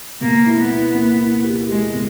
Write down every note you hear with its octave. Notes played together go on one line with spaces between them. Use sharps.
B2 A#3
E4
B3
E4
A#3
E4
G4
G#3 G4
B2